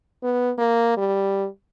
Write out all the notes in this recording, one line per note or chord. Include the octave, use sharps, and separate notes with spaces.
B3
A#3
G3